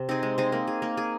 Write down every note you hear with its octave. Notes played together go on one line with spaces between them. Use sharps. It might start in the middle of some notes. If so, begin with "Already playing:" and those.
Already playing: C3
C4 D#4 G#4
G#3
C4 D#4 G#4
A#3
G#4
A#3
G#4